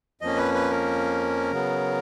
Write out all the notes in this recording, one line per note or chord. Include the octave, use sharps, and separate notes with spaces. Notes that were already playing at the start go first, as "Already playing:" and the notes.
F2 F3 A#3 C#4 D#5
B4
B4
A#4
C#3 F#3 B3